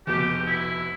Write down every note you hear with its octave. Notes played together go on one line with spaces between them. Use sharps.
F1 B2 G4
E4